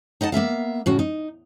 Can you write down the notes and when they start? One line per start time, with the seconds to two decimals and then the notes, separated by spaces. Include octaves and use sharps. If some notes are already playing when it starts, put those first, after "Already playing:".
0.21 D#4 D#5 F#5 A5
0.32 A#3 B3 E5 F5
0.86 A2 C#3 F#4
0.99 D#4